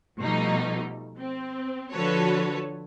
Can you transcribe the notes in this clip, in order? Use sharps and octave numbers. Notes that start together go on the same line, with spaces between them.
B2 F3 G3 A3 D#4
C4
D3 F3 F#4 A4 B4 C#5